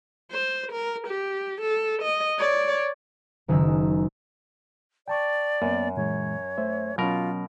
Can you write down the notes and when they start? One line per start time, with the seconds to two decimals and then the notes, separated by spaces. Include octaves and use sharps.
0.32 C5
0.72 A#4
1.07 G4
1.61 A4
2.02 D#5
2.38 C#5 D5
3.48 F#1 D#3 G#3 E6
5.08 D5 G5 A5 C#6
5.62 F#2 A#3 B3
5.96 A#2 E3 G#3 C#5
6.57 A3 C5 E5
6.98 B2 F#3 C#4 F4 A#4